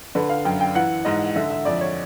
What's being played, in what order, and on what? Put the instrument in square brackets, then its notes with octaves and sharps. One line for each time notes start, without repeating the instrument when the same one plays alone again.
[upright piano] D3 B4
F5
F#2 G5
G5
E3 F#5
G#2 D#5
D3 E5
E5
F2 D5
C#5